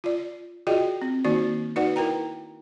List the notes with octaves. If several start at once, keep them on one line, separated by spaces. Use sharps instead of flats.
F4 D5
F4 F#4 G#4 D5 D#5 G5
C4
D#3 A#3 D#4 F#4 D5
D#4 F#4 B4 D5 F#5
E4 A#4 B4 G5 A#5